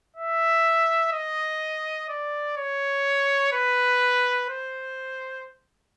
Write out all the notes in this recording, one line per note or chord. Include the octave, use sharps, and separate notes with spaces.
E5
D#5
D5
C#5
B4
C5